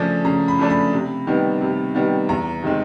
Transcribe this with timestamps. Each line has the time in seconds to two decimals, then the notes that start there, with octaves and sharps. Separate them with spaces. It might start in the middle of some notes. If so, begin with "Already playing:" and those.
Already playing: C#3 F3 A3 D4 G#5
0.25 C#3 A#5
0.48 B5
0.59 F3 A3 D4
0.70 B5
0.93 C3
1.27 D#3 G3 B3
1.61 C3
1.95 D#3 G3 B3
2.29 E2 A#5
2.63 C3 D#3 G#3 C4